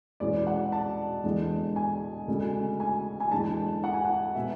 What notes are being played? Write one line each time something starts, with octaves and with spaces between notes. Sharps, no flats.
E2 B2 G#3 C#4 D5
F#5
A5
E1 E2 D3 G#3
G#5
D2 C#3 G#3
G#5
G#5
E2 D3 G#3 D4 A5
F#5
G#5
F#5
B2 G#3 B3 E5